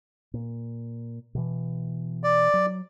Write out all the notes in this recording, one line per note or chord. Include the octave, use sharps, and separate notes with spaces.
A#2
B2 E3
D5
F#3